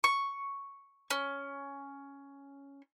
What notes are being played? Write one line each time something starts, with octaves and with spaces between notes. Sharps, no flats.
C#6
C#4